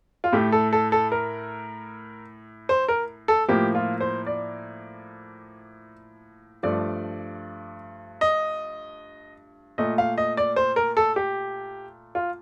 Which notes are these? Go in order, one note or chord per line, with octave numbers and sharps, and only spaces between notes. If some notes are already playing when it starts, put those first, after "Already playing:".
F4
A2 A3 G4
A4
A4
A4
A#4
C5
A#4
A4
A2 F3 A#3 G4
F4
C5
D5
G2 F3 A3 D5
D#5
A#2 A3 D#5
F5
D#5
D5
C5
A#4
A4
G4
F4